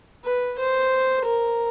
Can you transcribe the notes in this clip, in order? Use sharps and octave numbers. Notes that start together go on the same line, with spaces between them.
B4
C5
A#4